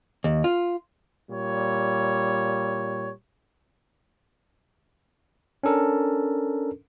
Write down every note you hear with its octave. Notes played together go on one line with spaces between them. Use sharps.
D#2
F4
A#2 G3 C#5
C#4 D4 A4 A#4